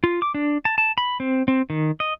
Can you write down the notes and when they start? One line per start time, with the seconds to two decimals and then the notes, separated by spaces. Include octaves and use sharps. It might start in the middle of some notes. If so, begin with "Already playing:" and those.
0.04 F4
0.22 D6
0.34 D4
0.65 A5
0.78 A5
0.98 B5
1.20 C4
1.48 C4
1.70 D#3
2.00 D#5